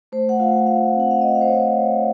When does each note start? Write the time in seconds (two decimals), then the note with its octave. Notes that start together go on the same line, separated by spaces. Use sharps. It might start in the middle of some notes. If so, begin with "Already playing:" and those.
0.12 A3 C5
0.29 F#5
0.40 F4 F5
0.66 A3 F5
0.94 C4
1.00 F#5
1.11 F5
1.21 A3 D#5
1.35 F5
1.41 C5
1.48 F4 C#5